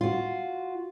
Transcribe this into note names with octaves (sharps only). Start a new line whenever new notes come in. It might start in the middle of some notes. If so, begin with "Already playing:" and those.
F4 F#4